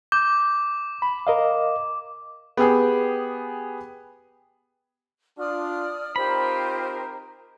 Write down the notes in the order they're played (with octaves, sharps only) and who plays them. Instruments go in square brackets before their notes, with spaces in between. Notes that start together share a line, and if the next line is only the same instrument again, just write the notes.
[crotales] D6 [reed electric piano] G6
[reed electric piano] B5
A#4 D#5 F5
[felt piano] B3 G4 G#4 G5
[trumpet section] D4 F4 [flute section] D5 D#6 F6
[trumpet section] C4 D#4 A#4 [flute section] F4 G4 C5 [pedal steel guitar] B5